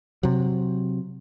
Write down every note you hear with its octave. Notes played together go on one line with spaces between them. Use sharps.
C3 F#3